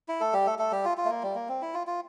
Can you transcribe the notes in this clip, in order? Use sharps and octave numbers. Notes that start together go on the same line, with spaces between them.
E4
A3 A4
G3 G4
A3 A4
A3 A4
G3 G4
F4
F4
A3
A#3
G3
A#3
C4
E4
F4
F4